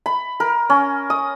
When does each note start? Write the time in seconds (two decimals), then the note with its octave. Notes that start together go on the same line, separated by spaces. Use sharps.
0.06 B5
0.40 A#4
0.70 C#4
1.10 D#6